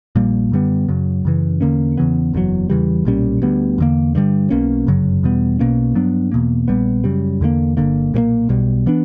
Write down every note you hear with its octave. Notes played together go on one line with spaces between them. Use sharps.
A#1 A#2 G3 A#3
F#2 D3 G3 B3
F#2 C#3 F#3
F#2 C#3 E3
E2 D3 A#3 C#4
E2 C#3 E3 B3
F#1 E2 C#3 F#3
E2 C#3 E3 G3
B1 A#2 G3 C#4
D2 D3 G3 B3
E2 D3 A#3
G2 D3 G3
B1 B2 A#3 C#4
G1 F#2 C#3 F#3
E2 B2 G3 B3
B1 B2 A#3 C#4
G2 F#3 B3 D4
E2 B2 A#3
A#1 A#2 G3 B3
F#2 C#3 G3
E2 D3 F#3 A#3
G1 F#2 D3 A#3
B1 A#2 G3 A#3
B1 B2 G3
E3 B3 D4